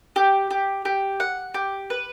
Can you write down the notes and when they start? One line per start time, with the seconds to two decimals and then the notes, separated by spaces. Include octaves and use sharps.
0.16 G4
0.51 G4
0.85 G4
1.20 F#5
1.54 G4
1.90 B4